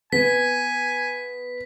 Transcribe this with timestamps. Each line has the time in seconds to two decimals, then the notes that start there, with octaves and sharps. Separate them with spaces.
0.12 B3 G#5 B6